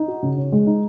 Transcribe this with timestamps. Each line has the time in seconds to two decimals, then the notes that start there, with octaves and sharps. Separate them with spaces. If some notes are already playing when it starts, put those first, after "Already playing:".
Already playing: D#4
0.08 F#4
0.23 C#3
0.37 C#4
0.52 G#3
0.67 D#4